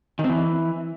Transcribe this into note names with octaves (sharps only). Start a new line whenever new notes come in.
D#3
C4
E3